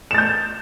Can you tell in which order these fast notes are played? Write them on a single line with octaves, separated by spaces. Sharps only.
E7 A6 G6